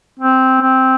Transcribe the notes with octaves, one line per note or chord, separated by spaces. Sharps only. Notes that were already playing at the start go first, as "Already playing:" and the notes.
C4
C4